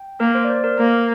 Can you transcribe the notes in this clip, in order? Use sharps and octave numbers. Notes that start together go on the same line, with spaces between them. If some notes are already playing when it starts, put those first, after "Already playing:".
Already playing: G5
A#3 A#4
C5
D5
C5
A#4
A#3 A#4